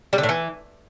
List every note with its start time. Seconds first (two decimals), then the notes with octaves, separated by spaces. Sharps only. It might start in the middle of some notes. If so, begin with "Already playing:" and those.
0.13 G3
0.18 D3
0.23 A2
0.29 E3